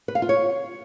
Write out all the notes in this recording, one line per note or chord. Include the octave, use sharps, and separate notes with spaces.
B4
F5
F4
C#5